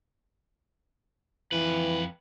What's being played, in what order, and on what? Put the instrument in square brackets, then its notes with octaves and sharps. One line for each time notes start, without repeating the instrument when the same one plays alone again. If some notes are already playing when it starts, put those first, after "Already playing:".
[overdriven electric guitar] F2 B4 [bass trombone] E3